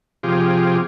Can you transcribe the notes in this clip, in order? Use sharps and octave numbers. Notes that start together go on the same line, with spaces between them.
C3 F3 F4 G4 G#4